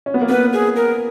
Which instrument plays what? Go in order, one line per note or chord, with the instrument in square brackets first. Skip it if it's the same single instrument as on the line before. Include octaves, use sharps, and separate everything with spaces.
[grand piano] C#4
B3
A#3
[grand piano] B3 [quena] B4
[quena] G#4
A#4